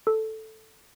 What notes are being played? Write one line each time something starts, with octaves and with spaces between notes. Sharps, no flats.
A4